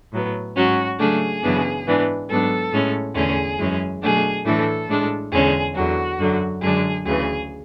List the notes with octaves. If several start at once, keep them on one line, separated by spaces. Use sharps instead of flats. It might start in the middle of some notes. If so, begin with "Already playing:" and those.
A2 F#3 B3
G#2 F#3 C#4 F#4
C#3 F#3 A3 D4 G#4
F#2 C#3 E3 B3 D4
G#2 E3 B3 D4
G#2 F#3 B3 D4 A4
A2 G#3 C#4
E2 D3 A3 C#4 G#4
F#2 E3 G#3 C#4
B2 F#3 A3 D4 G#4
A2 E3 A3 D4 A4
A2 G#3 D4
E2 D3 G#3 C#4 G#4
E2 D3 F#3 F#4
F#2 D3 F#3
F#2 D3 G#3 D4 G#4
D2 C#3 E3 G#4